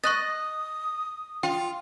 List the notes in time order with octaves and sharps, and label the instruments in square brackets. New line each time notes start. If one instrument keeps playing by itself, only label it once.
[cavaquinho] D#5 [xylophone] C#6 F#6 A6 [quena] D#6
[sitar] F4 [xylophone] G5